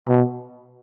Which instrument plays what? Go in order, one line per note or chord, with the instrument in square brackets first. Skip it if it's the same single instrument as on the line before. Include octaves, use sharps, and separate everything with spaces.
[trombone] B2